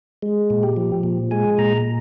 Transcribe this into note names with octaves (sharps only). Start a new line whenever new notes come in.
G#3
A#2
G4
F3
A#2
G#3 G#5
A#2 A#5